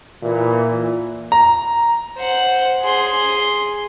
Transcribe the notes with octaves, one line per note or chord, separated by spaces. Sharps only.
A#2 E3
A#5
C5 F#5
G#4 C6